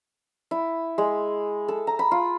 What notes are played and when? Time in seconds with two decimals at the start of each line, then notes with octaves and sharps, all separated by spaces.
0.51 E4
0.98 G#3
1.68 A4
1.87 A#5
1.99 B5
2.11 F4